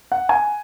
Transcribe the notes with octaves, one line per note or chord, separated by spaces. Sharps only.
F#5
G#5